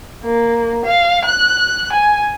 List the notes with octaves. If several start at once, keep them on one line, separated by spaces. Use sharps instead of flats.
A#3
F5
F#6
G#5